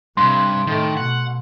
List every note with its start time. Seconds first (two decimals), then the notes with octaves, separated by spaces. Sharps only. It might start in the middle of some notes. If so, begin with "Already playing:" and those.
0.17 G2 C3 C6
0.67 A2 D#3 A3
0.97 B2 F#5